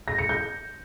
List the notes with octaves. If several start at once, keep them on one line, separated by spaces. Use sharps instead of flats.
A#6
C#7
G6